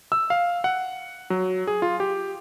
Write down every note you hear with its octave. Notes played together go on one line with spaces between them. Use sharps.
E6
F5
F#5
F#3
G#4
F4
G4